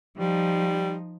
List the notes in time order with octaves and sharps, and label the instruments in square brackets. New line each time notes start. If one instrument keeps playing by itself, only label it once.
[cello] F3 D#4 [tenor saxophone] G3